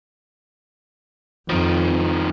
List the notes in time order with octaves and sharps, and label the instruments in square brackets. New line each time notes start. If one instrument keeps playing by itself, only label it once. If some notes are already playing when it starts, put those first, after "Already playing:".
[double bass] F2 [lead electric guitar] D#3 F3